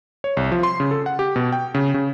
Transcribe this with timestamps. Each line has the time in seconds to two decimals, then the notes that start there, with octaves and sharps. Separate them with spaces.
0.24 C#5
0.37 C2
0.52 F3
0.63 C6
0.80 C#3
0.91 A4
1.06 F#5
1.19 G4
1.36 B2
1.53 G5
1.74 C#3
1.94 C#3